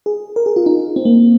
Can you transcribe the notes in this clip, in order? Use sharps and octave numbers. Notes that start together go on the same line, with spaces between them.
G#4
A#4
G#4
F4
D#4
C4
A#3